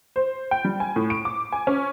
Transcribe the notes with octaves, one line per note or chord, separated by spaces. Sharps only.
C5
G5
G3
G#5
A2
D7
D6
G#5
C#4